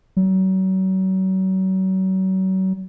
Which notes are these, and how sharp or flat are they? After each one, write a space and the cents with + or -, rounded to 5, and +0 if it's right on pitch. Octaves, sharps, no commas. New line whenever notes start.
F#3 +35